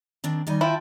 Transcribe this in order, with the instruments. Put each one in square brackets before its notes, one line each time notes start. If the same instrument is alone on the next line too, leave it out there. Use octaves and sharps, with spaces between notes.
[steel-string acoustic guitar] D#3 C4 D4
[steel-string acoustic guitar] D#3 D#5 G#5 [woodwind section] G3 D#4
[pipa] E4 [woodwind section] F4 G5 A5